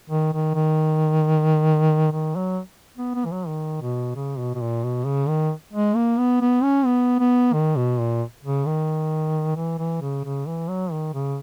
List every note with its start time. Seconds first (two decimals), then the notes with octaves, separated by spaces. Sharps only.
0.10 D#3
0.33 D#3
0.54 D#3
2.12 D#3
2.36 F#3
2.97 B3
3.15 B3
3.25 E3
3.32 F#3
3.47 D#3
3.81 B2
4.15 C#3
4.39 B2
4.55 B2
4.61 A#2
4.84 B2
5.06 C#3
5.28 D#3
5.73 G#3
5.96 A#3
6.18 B3
6.41 B3
6.63 C#4
6.85 B3
7.19 B3
7.53 D#3
7.76 B2
7.99 A#2
8.43 C#3
8.66 D#3
9.56 E3
9.78 E3
10.01 C#3
10.24 C#3
10.47 E3
10.68 F#3
10.92 D#3
11.14 C#3